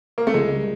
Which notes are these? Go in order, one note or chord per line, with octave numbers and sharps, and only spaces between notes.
A#3
A3
C#2 G#3
G3